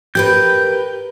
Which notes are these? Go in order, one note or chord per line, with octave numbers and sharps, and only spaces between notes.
G4 A#4 B4 G6